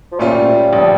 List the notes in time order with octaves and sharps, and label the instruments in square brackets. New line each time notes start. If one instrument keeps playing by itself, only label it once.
[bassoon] F3
[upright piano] A#2 A3 C#4 F4 [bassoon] G3
[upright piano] A1 F3